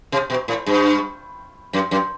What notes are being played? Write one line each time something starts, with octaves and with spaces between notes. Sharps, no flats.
C3
B2
A2
G2
F#2
F#2